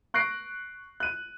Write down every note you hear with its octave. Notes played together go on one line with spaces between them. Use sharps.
C#6 F#6 A#6 C7 D7
F#6 D#7